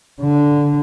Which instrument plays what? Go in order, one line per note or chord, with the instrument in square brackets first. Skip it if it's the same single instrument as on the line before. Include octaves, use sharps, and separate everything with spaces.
[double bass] D3